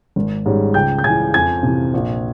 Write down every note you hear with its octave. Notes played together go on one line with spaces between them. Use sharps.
G#1
G#2 G3 C#4
C#2 G5 G6
G6
C#3 E3 G#5 G#6
F2 G#5 G#6
C3 E3
A#1